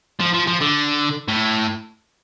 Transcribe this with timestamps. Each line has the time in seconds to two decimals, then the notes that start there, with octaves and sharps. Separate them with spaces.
0.21 F3
0.34 F3
0.48 F3
0.61 D3
1.28 A2